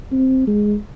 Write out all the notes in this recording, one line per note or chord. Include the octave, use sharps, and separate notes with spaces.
C4
G#3